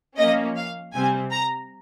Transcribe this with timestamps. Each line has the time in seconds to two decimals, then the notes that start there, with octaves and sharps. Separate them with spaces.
0.18 F3 A#3 C#4 D#5
0.56 F5
0.94 C3 G3 C4 G#5
1.32 A#5